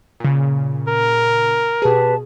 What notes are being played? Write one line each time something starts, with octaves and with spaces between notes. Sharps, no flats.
A#2 C#3
A#4
B2 G4 G#4 B4 A5